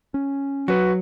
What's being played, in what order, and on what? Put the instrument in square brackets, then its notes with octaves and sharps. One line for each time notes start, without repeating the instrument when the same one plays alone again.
[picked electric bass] C#4
[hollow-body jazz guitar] F#3 [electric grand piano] F#4 B4